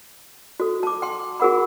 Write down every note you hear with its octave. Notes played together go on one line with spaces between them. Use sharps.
F#4 A4
A5 D6
G5 C6
F#4 G#4 A#4 F#5 B5